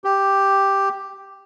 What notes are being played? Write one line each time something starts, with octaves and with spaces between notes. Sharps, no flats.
G4